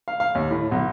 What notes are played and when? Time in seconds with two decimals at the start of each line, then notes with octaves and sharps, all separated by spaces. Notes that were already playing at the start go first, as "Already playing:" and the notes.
0.08 F5
0.20 F5
0.35 D#2
0.50 A2
0.71 B1